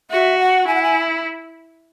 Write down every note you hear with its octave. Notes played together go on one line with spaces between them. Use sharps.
F#4 E5
F#5
E4 G#5
F#5
G#5